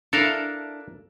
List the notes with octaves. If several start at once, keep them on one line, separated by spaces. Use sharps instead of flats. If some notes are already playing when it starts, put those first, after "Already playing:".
D4 E4 A4 A#4 F5